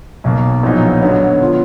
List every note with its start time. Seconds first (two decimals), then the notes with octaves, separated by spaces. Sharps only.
0.24 B1 B2 A#3
0.63 A#1 A#2 F#3 B3 D#4
1.02 D3 F#3 B3
1.41 F3 B3 F4